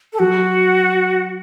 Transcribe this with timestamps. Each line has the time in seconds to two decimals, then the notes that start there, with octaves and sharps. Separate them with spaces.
0.13 A4
0.19 F#3 F#4